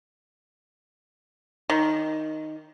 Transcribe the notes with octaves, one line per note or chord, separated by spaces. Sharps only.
D#3